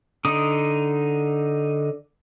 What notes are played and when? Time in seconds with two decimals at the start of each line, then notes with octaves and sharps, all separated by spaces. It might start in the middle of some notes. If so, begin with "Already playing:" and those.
0.25 D3 D#4 D#6